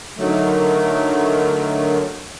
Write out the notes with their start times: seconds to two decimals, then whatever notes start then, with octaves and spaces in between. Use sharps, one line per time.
0.17 D3 D#3 F#3 A3